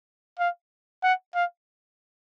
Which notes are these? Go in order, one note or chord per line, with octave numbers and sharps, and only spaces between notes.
F5
F#5
F5